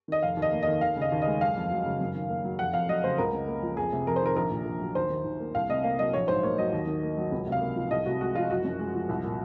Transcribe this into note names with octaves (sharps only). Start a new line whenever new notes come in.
D#3 D#5
F1 F5
D#2
D#5
A#3
D#3 D#5
D#2 F5
C#3
D#5
D#2
G#3 D#5
F#1 F5
F2
F#3
C#3
F#2
D#3
A#3
F#3
F1 F#5
F2 F5
F#3 D#5
C#3 C5
C#2 A#4
C#3
A#3
F3
F2 G#4
C3
F2 A#4
C5
D#3 A#4
A#1 A#4
A#2
A#1
F#3
D#2 C5
D#3
D#2
A#3
C2 F5
C3 D#5
A#3 F5
F#3 D#5
A#1 C#5
G#2 C5
A#3 C#5
F#3 D#5
D#2
D#3
A#3
F#3
C#2
C3
F5
A#3
F3
C2 D#5
C3 F#4
G#3 F#4
F3 F4
F#1 F#4
F#2
G#3
F3
C2
A#2